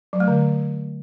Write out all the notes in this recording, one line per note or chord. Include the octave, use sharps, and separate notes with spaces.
F#3
A3
D3